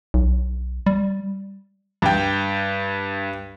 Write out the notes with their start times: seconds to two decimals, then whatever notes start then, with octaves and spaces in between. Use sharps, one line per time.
0.14 B1
0.86 G3
2.02 G2 G5